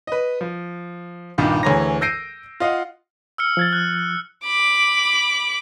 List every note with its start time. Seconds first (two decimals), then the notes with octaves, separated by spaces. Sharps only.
0.07 B4 D#5
0.41 F3
1.38 C2 G2 A#2 D#3
1.63 D2 E3 G#4 C#5 A#5 A#6
2.01 E6 G6 A#6 C7 D7 D#7
2.60 F4 D#5 F5 F#5
3.38 E6 F6 C#7
3.57 F3 G#6 A6
3.73 F#6
4.45 B5 D6